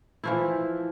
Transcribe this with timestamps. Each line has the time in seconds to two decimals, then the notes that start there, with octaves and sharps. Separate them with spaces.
0.24 E3 F3 E4